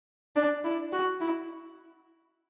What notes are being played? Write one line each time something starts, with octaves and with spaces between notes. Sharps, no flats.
D4
E4
F#4
E4